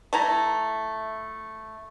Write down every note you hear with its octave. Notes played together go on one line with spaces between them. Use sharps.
A3 E4 A#5